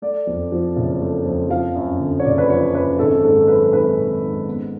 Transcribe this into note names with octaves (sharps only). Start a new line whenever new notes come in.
A3 D5
F2
F3
F#1
A3
F2
F3 F5
F#2
D3
C#5
F#1 D5
B4
F3 C#5
F#2 B4
G#1 A4
G#2 A4
F#3 B4
G#1 B4
G#1
G#2
B3